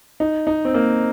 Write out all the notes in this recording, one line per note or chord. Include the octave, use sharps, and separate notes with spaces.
D#4
D#4
C4
A#3